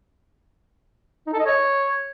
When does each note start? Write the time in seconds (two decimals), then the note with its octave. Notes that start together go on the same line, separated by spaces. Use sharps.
1.27 D#4
1.33 A4
1.39 D#5
1.46 C#5